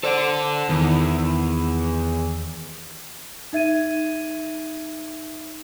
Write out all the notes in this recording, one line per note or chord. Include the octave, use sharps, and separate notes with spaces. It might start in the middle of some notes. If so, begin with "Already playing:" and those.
A4 C5 D5 F#5
E2 D#3 E3
D#4 E5 G#6 D#7